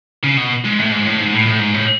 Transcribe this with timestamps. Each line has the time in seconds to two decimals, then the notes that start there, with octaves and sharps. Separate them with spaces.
0.23 C#3
0.37 B2
0.64 G#2
0.79 A2
0.92 G#2
1.06 A2
1.19 G#2
1.33 A2
1.46 A2
1.59 G#2
1.74 A2